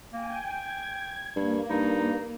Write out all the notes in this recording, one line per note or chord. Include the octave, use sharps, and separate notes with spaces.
A#3 G5 G#5
G5 G#6
G2 A#3
G2 D#4